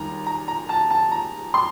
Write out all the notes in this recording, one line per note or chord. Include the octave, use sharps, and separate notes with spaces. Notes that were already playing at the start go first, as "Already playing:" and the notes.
Already playing: D#2 D#3 G3 A#5
A#5
A#5
A5
A5
A#5
C6